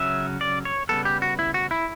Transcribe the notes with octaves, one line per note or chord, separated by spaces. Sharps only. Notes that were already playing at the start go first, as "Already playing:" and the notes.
Already playing: C#3 F#3 C#4 E5
D5
C#5
C#3 G3 B3 A4
G4
F#4
E4
F#4
E4